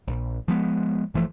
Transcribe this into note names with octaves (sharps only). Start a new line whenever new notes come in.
A#1
F3 G#3 B3
G1 E3 F3 A3